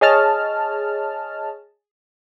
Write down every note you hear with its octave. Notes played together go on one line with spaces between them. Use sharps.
G#4 C#5 D#5 A5 F6